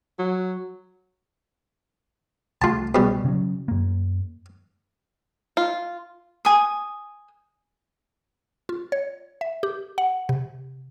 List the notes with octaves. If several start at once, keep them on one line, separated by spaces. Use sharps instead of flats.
F#3
C2 A3 F4 A5
B2 G3
C#3 F#3
F#2 A#3
F4
G#5 D#6
F4
C#5
E5
G4
F#5
C3